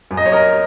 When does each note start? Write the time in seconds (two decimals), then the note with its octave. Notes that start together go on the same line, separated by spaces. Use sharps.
0.11 F#2
0.17 D#5
0.26 C#5
0.32 A#4 D#5